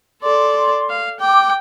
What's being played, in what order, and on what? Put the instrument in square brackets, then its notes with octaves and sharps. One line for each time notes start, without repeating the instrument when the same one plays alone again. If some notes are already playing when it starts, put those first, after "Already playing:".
[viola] A4 D5 [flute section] C6
[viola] F5
[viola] G5 [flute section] D6